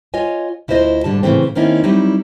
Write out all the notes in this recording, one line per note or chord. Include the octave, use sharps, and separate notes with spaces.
F4 C#5 D#5 G#5
D2 E4 F4 C5 D#5
G#2 D3 G3 A5
A2 C#3 E3 A3 C4
D#3 A#3 C4 C#4 D#4 E4
F#3 G3 C4 D#4 E4